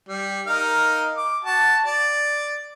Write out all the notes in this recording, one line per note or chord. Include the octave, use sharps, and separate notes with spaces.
G3
D#4 A#4 F5
D6
F#4 A5
D5